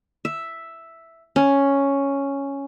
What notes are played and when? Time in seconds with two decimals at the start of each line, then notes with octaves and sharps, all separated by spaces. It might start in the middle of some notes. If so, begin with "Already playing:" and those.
0.25 E5
1.36 C#4